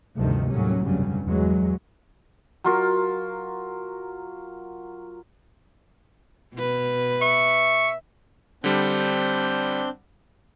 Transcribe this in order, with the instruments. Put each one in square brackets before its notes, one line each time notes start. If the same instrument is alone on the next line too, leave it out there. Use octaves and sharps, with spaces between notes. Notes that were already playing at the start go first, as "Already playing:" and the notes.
[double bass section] D2 G2 C3 D#3 F3 A3
D#2 A2 F#3 G3 C#4
F1 B1 G2 C#3 F#3 G3
E2 F#3 G#3
[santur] F#3 F4 A#4
[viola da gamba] B2 B4
[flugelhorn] E5 [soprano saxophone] C#6
[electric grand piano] D3 G3 [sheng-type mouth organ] C4 D4 G6